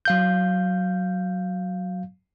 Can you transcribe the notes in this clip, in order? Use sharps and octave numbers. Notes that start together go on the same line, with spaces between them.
F#3 F5 G6